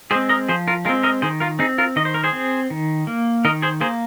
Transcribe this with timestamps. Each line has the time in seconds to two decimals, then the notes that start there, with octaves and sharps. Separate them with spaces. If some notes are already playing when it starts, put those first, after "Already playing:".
0.11 G#3 C4 G#4 C5
0.29 A#4 D#5
0.48 F3 G#4 C5
0.68 F4 A#4
0.85 G#3 F4 A#4
0.89 C4
1.03 A#4 D#5
1.22 D#3 G#4 C5
1.40 F4 A#4
1.59 C4 D#4 G#4
1.78 F4 A#4
1.96 D#3 D#5
2.05 C5
2.14 A#4
2.24 G#4 C5
2.33 C4
2.70 D#3
3.07 A#3
3.45 D#3 A#4 D#5
3.62 G#4 C5
3.81 A#3 G#4 C5